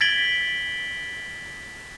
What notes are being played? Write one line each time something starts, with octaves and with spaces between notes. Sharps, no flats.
G#6 A6 B6 D7 F#7 G7